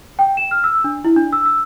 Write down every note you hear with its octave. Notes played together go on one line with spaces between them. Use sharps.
G5
E7
F6
E6
D4
E4
D4
E6
E6